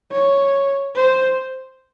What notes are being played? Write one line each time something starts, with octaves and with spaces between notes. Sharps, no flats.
C#5
C5